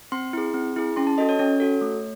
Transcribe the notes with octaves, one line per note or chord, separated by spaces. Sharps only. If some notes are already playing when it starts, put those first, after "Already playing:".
C4 C6
E4 G#4
C4
E4 G#4
C#4 C6
A5
F#4 A4 D#5
C#5
C#4 C#5
F#4 A4
A3